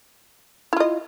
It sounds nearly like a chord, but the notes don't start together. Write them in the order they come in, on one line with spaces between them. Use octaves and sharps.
E4 F4 D#5